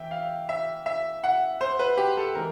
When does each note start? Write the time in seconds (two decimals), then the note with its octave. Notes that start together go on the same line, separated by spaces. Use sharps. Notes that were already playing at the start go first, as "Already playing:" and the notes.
Already playing: E3 E5 G5
0.11 F5
0.49 E5
0.86 E5
1.24 F#5
1.61 C5
1.79 B4
1.97 G4
2.17 A4
2.35 E3 G#3 A#4